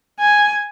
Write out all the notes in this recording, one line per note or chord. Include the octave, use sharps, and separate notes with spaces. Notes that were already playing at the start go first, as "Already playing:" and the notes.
G#5